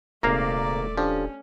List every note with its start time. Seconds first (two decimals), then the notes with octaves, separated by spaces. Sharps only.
0.23 D#1 G#1 C3 A3 A#3 D5 F5 A#5
0.97 F3 C#4 D4 G4 A4